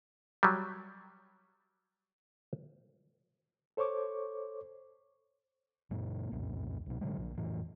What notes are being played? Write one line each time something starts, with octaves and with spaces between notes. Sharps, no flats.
F#3 G3
A4 C5 C#5 C#6 D6
F#2 A#2 A#3
C2 F2 A#2
C2 B2
A2 D3 F#3 G#3
A#1 D4
F2 A2 E3